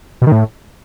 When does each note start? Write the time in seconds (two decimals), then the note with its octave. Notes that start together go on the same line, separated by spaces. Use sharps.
0.22 B2
0.27 D#3
0.32 A2